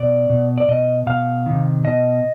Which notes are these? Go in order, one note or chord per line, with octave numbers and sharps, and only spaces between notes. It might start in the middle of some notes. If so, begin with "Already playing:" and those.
Already playing: B2 D5
B2
D5
B2 D#5
B2 F5
C3 D#3
B2 D#5